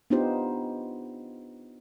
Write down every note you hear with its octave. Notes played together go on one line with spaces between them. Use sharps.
B3 D4 D#4 F4 G4 C5